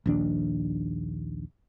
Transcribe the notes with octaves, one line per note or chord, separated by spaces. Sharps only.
A#1 D#2 D4